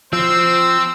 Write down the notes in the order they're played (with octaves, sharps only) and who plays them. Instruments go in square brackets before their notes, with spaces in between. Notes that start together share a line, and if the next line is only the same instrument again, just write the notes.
[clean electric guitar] F3 [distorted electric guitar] C4 [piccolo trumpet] C5 [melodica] E6